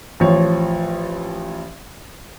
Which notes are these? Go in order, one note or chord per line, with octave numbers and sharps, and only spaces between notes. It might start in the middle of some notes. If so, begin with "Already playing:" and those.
A1 F3 C#5